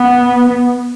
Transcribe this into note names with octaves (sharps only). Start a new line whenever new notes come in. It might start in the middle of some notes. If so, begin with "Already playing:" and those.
Already playing: B3